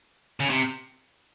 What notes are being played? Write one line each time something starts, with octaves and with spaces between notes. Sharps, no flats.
C#3
C3